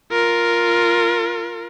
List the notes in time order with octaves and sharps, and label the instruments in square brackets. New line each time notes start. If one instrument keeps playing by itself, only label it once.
[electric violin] F4 A#4